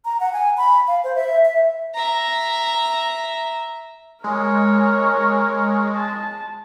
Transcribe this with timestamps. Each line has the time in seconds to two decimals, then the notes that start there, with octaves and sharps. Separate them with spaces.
0.05 A#5
0.20 F#5
0.33 G#5
0.57 B5
0.88 F5
1.04 C5
1.15 E5
1.45 E5
1.94 E5 A#5
4.24 G#3 A#4 C#5
5.96 A5